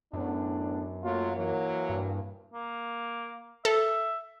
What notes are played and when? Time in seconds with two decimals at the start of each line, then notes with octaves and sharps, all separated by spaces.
0.13 F#2 A2 B3 D4
1.04 F#3 A3 A#3 F4
1.36 E3 F#3 A#3
1.90 G2
2.54 A#3
3.65 A4 E5